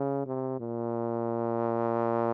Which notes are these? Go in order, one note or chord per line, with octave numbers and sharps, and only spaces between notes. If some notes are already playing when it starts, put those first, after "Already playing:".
Already playing: C#3
C3
A#2